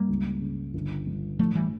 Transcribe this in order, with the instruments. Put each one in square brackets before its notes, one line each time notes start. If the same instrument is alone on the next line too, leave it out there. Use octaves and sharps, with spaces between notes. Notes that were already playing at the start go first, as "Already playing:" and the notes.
Already playing: [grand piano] G2 [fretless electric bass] G3 A#3
[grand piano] C#2
C#3
G1
G2
[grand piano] A2 [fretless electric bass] F3 A3
[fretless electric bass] E3 G3